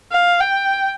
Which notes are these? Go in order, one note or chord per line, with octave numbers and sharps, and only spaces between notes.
F5
G5